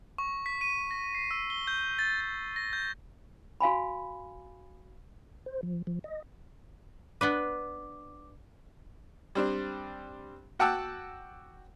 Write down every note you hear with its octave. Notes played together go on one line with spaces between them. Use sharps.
C#6
B6
D#7
A#6
C7
E6
G7
G6
A6
A6
A#6
G6
F#4 F5 G#5 B5
C5
F3
F3
D#5
B3 D4 B4 D6
G3 C4 D4
F#4 F#5 G5 A5 D6 E6